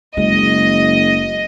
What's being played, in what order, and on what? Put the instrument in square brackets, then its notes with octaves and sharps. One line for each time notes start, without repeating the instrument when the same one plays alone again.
[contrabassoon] F#1 [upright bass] G#3 [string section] D#5